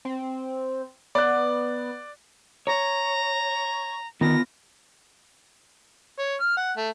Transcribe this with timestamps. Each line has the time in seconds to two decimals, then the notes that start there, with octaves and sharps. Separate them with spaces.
0.05 C4
1.15 B3 D5 F#6
2.67 C#5 A#5
4.21 D#3 B3 F4 A#6
6.19 C#5
6.41 F6
6.57 F#5
6.77 A3